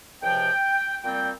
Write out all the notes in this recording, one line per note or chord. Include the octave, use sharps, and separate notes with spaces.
C#2 C3 F3 G5
A#2 G3 C4 G5